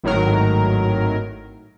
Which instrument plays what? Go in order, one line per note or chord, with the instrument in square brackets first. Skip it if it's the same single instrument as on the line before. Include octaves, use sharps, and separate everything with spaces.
[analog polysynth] G#1 A2 D#3 F#3 A#4